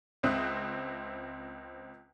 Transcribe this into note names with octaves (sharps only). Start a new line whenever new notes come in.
C#2 C4 E5 D#6 F#6